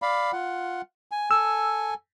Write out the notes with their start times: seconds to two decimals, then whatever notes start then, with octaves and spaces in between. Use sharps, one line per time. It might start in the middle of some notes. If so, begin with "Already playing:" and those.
0.02 D5 F5 B5
0.33 F4 F#5
1.11 G#5
1.31 A4 G#5 E6